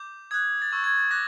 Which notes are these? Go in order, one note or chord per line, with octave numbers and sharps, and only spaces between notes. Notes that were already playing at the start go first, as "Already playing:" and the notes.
Already playing: D6 G6
D#6 F#6 G#6
A6
C#6 E6 G6 G#6
G#6
A6
D6 F#6 A#6